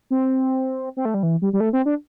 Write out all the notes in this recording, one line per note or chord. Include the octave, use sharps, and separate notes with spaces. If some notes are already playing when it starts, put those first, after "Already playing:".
C4
C4
A3
G3
E3
G3
G3
A3
C4
D4